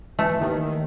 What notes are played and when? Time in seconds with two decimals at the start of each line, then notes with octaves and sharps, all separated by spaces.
0.19 E3 A3
0.41 D#2 D#3